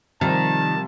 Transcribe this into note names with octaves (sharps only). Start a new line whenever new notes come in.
C3 D#3 F3 G3 A5